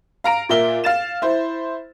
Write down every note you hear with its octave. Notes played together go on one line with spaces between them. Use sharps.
F5 A#5 D7
A#2 A#4 E5 G7
F5 A6 E7
E4 C5